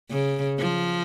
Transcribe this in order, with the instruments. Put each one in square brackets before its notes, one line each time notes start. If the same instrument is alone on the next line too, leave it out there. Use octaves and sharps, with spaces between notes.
[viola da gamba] C#3
F3